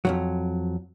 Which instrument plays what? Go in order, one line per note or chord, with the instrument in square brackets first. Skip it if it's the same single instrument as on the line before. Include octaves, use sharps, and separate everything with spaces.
[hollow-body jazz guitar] F2 G#2 F#3